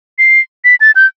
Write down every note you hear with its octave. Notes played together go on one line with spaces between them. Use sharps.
C7
B6
A6
G6